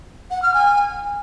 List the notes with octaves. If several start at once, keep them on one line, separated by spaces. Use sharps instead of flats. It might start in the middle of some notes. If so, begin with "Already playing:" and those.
F#5
F6
G#5